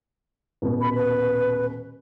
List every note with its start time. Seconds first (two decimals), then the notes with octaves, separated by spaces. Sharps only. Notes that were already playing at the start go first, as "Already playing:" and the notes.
0.62 D#1 B2
0.81 B5
0.95 B4